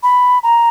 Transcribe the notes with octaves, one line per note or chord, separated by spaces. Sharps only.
B5
A#5